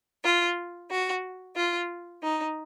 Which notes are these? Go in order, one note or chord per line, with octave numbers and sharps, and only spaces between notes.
F4
F#4
F4
D#4